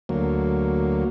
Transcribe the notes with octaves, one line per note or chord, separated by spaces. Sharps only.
D2 F#3 A#3